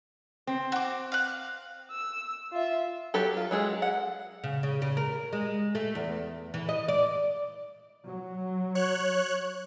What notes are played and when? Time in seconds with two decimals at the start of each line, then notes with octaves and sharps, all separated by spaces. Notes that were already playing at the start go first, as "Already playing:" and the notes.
0.47 C4
0.72 F#4 D6
1.12 F5 F#6
1.92 E6
2.52 F4 E5
3.14 F#3 G4 A4
3.37 F4
3.51 F#3 G#3 G#4 A4
3.82 F#5
4.44 C#3
4.63 C#3
4.82 C#3
4.97 A#4
5.33 G#3
5.75 A3
5.95 E2
6.54 E3
6.69 D#5
6.88 D5
8.06 F#3
8.75 C#5 F#6